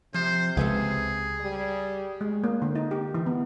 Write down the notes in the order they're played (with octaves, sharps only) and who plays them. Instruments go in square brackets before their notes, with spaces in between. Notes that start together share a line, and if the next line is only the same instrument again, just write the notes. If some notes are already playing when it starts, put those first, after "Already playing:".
[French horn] C3 [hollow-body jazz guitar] F3 [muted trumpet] C5
[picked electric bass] C#2 [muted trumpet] G#4 [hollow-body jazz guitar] A4 B4 F5
[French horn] G3
[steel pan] G#3
A#3
D3
D#4
G4
E3
B3